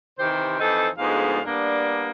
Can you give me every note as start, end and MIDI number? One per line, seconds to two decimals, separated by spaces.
0.19 0.57 48
0.19 0.57 51
0.19 0.57 52
0.19 0.57 67
0.19 0.57 72
0.60 0.88 41
0.60 0.88 52
0.60 0.88 60
0.60 0.88 63
0.60 0.88 69
0.98 1.40 38
0.98 1.40 44
0.98 1.40 53
0.98 1.40 56
0.98 1.40 59
0.98 1.40 77
1.45 2.11 55
1.45 2.11 58
1.45 2.11 59
1.45 2.11 62